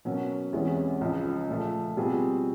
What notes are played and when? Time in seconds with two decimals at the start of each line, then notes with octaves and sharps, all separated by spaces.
0.05 B2 F#3 A#3 C#4
0.53 E2 C3 E3 G#3 C#4
1.01 C#2 C#3 F3
1.49 A#2 F3 A3
1.97 B2 G3 C4 F4 G#4